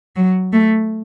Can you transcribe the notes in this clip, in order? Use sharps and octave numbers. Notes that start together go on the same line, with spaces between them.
F#3
A3